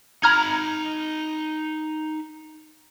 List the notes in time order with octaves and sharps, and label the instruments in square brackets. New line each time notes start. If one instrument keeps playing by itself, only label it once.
[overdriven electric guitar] D#4 B5 [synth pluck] A#5 F6 G#6